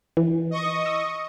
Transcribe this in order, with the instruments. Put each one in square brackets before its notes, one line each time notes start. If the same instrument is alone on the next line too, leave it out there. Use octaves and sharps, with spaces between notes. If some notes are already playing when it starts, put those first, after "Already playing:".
[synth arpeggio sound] E3
[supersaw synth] D#5 C#6 D#6
[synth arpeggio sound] E6